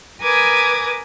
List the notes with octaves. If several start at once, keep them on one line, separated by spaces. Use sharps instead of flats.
A#4 B4 G#5 D6 D#6 G#6